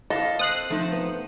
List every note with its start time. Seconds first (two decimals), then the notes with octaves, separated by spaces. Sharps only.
0.10 A4 D#5 F5
0.39 C4 D#6 F#6 C7
0.70 F3 A3 D#4 C5
0.92 B3